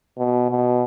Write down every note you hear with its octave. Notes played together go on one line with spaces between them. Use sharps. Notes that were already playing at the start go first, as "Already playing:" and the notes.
B2
B2